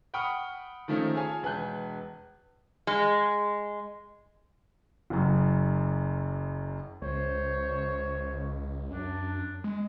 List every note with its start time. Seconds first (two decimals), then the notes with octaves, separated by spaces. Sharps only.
0.14 F#5 G5 B5 C#6 D#6 F6
0.88 D#3 F3 A3 C#4 D#4 F4
1.14 F4 G#4 C#5 F5 G#5 A5
1.43 E1 B4 G#5 F#6 G6
2.87 G#3
5.10 F#1 F#2
7.02 C#2 C5 C#5
8.91 F#2 D4
9.64 G#3